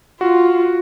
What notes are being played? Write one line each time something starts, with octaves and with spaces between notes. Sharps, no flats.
F4 F#4